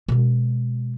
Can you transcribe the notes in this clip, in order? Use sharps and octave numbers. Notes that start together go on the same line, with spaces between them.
B2 G#3